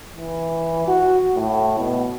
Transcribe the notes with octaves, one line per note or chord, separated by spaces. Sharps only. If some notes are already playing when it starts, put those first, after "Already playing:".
E3
F#4
A2
B2